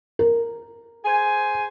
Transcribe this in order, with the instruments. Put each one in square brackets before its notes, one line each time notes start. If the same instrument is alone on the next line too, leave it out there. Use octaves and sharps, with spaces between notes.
[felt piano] A#4
[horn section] G#4 C5 G#5